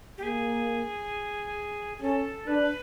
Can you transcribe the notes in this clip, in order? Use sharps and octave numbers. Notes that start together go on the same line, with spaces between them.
G4
A#3 G#4
G#4
C#4 A4
D4 B4